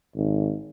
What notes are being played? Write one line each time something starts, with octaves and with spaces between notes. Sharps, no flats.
G#1